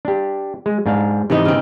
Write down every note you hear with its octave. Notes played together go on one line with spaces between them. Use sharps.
D4 G4
G#3
G#2 D4 F5
G#2 C3 E3 B3 D#4
C#3 C4